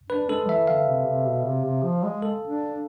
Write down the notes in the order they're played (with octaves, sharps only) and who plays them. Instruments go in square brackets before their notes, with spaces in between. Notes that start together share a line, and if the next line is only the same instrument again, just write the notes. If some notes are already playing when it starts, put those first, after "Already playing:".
[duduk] D4 [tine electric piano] B4
[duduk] G#3 [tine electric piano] A4
[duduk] E3 [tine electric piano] E5
[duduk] D3 [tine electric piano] F5
[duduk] C3
C3
B2
C3
C3
F3
G#3
[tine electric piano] A4
[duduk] D4